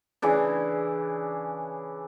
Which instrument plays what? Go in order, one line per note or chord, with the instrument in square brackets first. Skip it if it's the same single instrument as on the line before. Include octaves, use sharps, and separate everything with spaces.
[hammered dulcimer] C#3 E3 D4